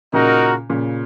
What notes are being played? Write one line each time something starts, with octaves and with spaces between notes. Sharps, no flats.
A#2 C#3 D#4 F#4 A#4
A#2 C#3